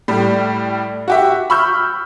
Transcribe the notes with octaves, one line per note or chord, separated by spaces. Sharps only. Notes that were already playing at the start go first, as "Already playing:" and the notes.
A2 G3
F#4 G4 E5
B5 C#6 E6 F6 G6